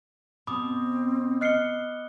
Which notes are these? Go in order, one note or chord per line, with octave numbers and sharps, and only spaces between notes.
B2 C4 B5 D6 D#6
D#5 F6 F#6 C7 C#7 G7